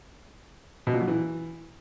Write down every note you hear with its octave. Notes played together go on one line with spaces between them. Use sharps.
B2
A#2
F#3
E3